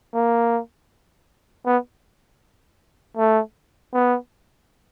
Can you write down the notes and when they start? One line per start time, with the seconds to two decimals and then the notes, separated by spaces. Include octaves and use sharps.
0.14 A#3
1.66 B3
3.18 A3
3.94 B3